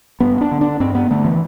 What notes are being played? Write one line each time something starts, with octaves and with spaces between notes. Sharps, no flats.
G2 B3
D4
D3
D4
G2 C4
B3
D3 A3
E3